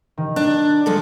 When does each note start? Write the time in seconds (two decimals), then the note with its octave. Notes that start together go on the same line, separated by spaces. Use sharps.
0.18 D#3
0.36 D4
0.86 F3 G#3 A4